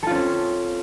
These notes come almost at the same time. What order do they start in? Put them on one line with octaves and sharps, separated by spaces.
A4 F4 C#4 C4